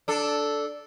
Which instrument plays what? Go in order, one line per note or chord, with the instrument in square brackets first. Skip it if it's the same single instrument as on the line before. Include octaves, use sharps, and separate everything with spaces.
[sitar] D4 A4